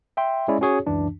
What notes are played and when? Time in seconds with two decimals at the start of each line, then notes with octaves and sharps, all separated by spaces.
0.17 E5 G5 C6
0.48 G#3 C#4 E4 D5
0.61 C#4 F#4 G#4 C#5
0.86 C#2 F#2 E3 D4